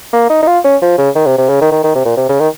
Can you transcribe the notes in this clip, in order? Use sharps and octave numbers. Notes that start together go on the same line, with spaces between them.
A#3
D#4
D#4
F4
C#4
F3
C#3
D#3
C3
C3
C#3
D#3
D#3
D#3
C3
A#2
C3
C#3
D#3